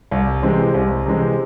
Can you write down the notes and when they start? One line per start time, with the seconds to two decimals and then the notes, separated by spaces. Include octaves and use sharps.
0.11 C2
0.43 C3 E3 G#3 C4
0.74 C2
1.06 C3 E3 G#3 C4